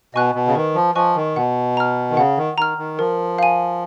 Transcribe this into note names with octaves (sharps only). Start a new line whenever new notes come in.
B2 D#5 G#5 C#6 F#6
B2
C#3
D#3 B4
F3
F3 D#5 G#5 C#6 F#6
D#3
B2 F#5
A#5 F6
D#3
C#3 F#5
D#3
D#3 A#5 F6
D#3
F3 A#4
F5 G#5